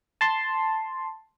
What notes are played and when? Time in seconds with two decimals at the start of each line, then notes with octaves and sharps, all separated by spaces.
0.21 A5 C6